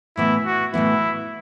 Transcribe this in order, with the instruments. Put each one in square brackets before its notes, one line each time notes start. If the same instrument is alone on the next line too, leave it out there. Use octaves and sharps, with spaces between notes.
[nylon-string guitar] A2 E3 B3 [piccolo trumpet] E4
[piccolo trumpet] F#4
[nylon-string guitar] A2 E3 B3 [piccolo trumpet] E4